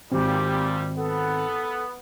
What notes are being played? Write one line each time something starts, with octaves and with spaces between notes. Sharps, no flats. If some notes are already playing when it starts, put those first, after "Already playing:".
G#1 A#2 G3 C4 G4
B3 A4